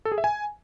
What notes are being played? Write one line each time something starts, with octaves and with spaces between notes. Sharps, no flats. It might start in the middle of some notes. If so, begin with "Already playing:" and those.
A4
G#4
E5
G#5